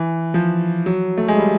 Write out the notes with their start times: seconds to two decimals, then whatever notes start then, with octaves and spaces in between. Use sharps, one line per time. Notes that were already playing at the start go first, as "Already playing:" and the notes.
Already playing: E3
0.34 F3
0.86 F#3
1.18 A3
1.28 G#3
1.38 G3